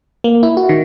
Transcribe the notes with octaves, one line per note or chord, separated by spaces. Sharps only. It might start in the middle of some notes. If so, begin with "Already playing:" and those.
A#3
E4
F#4
D#3